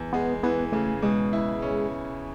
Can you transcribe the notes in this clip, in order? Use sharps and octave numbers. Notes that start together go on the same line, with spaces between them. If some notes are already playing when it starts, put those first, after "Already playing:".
Already playing: E2
G#3 B3
E3 B3
C#3 A3
B2 G#3
E4
C#4